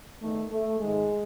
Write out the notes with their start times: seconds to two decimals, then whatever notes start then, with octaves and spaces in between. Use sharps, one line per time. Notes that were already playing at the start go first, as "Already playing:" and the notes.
0.21 E2 D#3 A3
0.50 A3
0.79 G#2 D#3 G#3